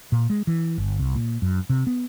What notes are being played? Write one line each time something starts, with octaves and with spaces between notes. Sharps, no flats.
A#2
G#3
E3
G1
C2
A#2
F#2
C3
B3